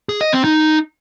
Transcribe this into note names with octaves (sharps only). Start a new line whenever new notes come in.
G#4
D#5
C4
D#4